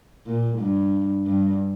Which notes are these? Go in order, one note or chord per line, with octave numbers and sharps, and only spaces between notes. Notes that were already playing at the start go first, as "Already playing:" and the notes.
A#2
G2
G2